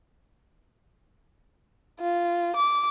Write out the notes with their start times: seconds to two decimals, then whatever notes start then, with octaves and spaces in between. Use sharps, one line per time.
2.00 F4
2.56 D6